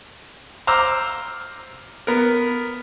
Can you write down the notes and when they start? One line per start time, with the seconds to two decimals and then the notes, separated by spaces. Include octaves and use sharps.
0.67 C5 A#5 D6 E6 F6
2.07 B3 A#4